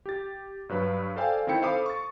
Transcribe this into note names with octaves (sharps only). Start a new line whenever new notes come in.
G4 A6
G2 F#3 B4 B5
A4 C5 D5 F5 G5 G#5
D#3 C4 D#4 E4 G5 C#7
A4 C5 F5 B5 D6 D#6
C#6 A6